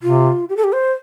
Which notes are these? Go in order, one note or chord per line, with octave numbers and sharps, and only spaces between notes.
C3 F4
G4
A4
G4
C5